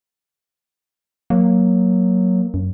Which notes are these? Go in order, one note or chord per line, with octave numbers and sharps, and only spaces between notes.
F#3 A#3
F#2